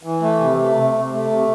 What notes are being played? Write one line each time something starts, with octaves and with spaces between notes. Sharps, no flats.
E3
A3
C3
A3
C3
C3
A3
C3